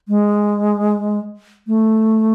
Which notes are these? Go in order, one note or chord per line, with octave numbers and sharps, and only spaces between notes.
G#3
A3